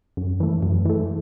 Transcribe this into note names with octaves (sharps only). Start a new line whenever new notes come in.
F#2
E3 A3
F#2
E3 A3